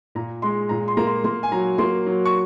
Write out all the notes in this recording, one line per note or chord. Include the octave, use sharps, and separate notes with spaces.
A#2 A#5
G#3 C6
A#2 A#5
C6
A#3 A#5
C6
A#3 C6
G#5
F#3 A#5
A#3 C6
F#3
C#6